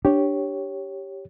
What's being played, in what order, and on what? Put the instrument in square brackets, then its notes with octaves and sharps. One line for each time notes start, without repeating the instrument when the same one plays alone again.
[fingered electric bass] D4 [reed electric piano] G4 C#5